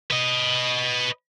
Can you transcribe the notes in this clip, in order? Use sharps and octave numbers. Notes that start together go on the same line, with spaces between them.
B4 D#5